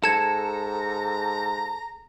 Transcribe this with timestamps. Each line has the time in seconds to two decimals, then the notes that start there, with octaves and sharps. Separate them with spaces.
0.04 G#2 A4 A#5 G#6 C#7 E7